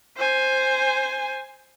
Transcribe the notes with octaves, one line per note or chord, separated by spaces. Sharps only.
C5 G#5